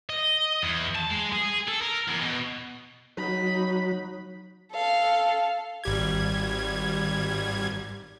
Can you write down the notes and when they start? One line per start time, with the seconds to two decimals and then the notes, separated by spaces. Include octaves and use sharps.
0.10 D#5
0.63 E2
0.95 A5
1.10 G#3
1.32 G#4
1.68 A4
1.82 A#4
2.08 E2
2.21 B2
3.18 F#3 D#4 B5
4.72 A4 F5
5.84 G#1 G3 G#6